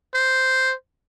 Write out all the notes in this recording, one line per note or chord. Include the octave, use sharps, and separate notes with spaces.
C5